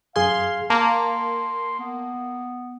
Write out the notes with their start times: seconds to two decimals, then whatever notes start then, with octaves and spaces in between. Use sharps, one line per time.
0.16 F#2 G#4 F5 C6 G#6
0.70 A#3 A5 C6
1.79 B3